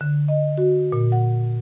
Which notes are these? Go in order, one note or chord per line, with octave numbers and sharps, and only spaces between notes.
D3
D#5
F#4
A#2
F#5